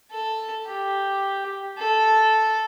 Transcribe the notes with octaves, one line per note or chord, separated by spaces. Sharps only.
A4
G4
A4